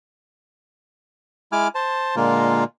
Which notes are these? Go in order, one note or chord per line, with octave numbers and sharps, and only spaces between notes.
G#3 E4 G#5 D6 F6
C5 A5
A#2 D3 G#3 A#3 F4